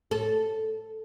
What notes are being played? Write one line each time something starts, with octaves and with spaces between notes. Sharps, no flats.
A4